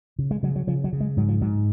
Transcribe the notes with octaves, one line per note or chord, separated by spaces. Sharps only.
C#3
G#3
C#3 F#3
F#3
C#3 F3
F#3
C#3
G#3
G#2 F#3
F3
G#2 F#3